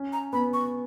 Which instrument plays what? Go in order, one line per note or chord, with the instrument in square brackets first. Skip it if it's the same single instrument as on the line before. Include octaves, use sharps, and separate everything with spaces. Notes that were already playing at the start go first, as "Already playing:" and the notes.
Already playing: [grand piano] C#4
[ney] A#5
[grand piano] B3 [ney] B5
[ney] C#6